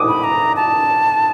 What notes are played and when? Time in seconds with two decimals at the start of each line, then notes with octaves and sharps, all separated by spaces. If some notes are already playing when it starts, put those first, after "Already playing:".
Already playing: D6 D#6
0.08 B5
0.24 A#5
0.56 A5